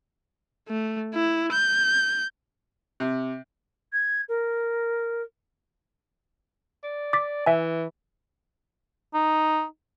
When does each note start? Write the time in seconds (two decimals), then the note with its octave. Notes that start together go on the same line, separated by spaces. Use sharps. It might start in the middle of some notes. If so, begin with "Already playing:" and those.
0.69 A3
1.14 E4
1.52 G6
3.00 C3
3.92 G#6
4.28 A#4
6.83 D5
7.13 D6 A6 B6
7.46 E3 E5 G#5
9.14 D#4